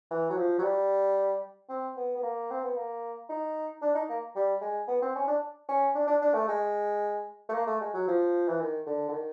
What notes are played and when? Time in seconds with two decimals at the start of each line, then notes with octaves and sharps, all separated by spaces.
0.11 E3
0.30 F#3
0.37 F3
0.59 F#3
0.63 G3
1.70 C4
1.97 B3
2.17 B3
2.23 A#3
2.51 C4
2.64 B3
2.77 A#3
3.29 D#4
3.82 D4
3.95 D#4
4.09 A#3
4.36 G3
4.62 G#3
4.88 B3
5.02 C4
5.16 C#4
5.28 D4
5.69 C#4
5.95 D4
6.07 D4
6.22 D4
6.34 A3
6.48 G#3
7.49 A3
7.54 A#3
7.67 A3
7.81 G#3
7.94 F#3
8.08 F3
8.48 E3
8.61 D#3
8.87 D3
9.09 D3
9.13 D#3